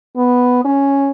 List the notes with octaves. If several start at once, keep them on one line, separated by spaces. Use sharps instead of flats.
B3
C#4